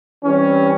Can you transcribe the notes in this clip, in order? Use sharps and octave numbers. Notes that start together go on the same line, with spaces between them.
E3 G3 C4 C#4